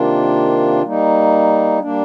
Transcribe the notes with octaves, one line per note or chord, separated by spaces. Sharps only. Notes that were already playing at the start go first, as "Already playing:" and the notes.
Already playing: C3 D#3 A#3 D4 F4
G3 A#3 D#4
G3 A#3 D4